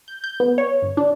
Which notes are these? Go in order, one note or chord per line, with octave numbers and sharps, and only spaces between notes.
G6
G6
B3
C#5
G1
D4